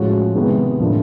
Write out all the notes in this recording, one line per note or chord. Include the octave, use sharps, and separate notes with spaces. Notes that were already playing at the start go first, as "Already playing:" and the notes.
Already playing: A2 F3 G#3 C#4 F#4
C3 D#3 G#3 B3 E4
A2 F3 A#3 D4